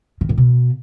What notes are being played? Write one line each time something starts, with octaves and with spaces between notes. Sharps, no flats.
D#3
A2
B2